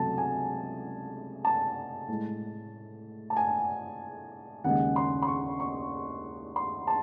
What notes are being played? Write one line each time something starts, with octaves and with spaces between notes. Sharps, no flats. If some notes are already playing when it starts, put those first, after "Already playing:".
Already playing: C#2 C3 F#3 A3 A5
G#5
A5
A2 G#3
A5
G#5
D#2 C#3 G#3 F#5
C6
C6
C#6
C#6
C6
A5